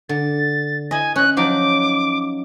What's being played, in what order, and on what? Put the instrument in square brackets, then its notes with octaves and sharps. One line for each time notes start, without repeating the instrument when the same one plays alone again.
[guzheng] D3 [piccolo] A6
[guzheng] E4 D#5 [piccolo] G#5
[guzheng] C#4 D#5 [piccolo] F#6
[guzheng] F3 F#3 D#4 [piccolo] D6